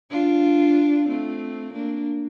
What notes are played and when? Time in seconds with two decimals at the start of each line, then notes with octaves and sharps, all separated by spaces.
0.11 D4 F4
1.08 A3 C4
1.73 A#3 D4